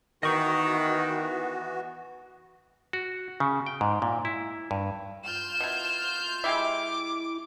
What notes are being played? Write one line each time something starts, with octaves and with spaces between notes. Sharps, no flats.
D#3 E3 B3 F#4 D#5 C#6
F#4
C#3
G5
G#2
A#2
E4
G2
F4 F6 G6 E7
B2 E4
G#3 E4 G4 E5 D6